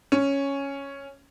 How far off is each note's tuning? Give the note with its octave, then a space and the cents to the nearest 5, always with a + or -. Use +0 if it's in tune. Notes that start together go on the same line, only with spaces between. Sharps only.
C#4 +0